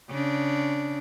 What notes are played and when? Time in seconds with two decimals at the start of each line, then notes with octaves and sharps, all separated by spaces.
0.11 C#3 D4